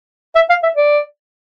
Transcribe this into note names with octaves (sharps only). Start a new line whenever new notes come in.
E5
F5
E5
D5